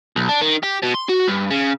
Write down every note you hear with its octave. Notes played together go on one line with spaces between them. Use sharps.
B1
D4
D#3
G4
B2
C6
F#4
G2
C#3